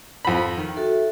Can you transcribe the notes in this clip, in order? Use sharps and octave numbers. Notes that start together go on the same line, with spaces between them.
F2 B5
D#3
F#4 A4 E5